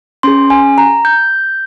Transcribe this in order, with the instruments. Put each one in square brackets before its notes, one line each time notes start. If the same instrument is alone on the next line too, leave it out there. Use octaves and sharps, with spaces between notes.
[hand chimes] C#4 G#4 C6
G#5
A#5
G6